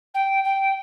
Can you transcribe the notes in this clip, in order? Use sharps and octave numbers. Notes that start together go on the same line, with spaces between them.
G5
G5